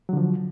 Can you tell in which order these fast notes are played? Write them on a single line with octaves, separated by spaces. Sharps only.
F#3 D3 F3